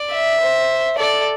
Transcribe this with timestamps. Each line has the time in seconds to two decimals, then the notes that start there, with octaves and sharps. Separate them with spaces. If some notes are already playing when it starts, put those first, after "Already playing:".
Already playing: D5
0.12 E5
0.40 C5
0.97 A4 D5